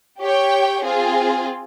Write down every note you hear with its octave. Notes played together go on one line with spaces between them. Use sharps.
G4 C#5 G5
C4 F4 G#4